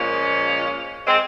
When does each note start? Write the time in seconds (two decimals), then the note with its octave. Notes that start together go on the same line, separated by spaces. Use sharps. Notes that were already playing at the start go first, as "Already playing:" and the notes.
Already playing: A#2 F3 G#3 A#3 C#4
1.06 G#3 C4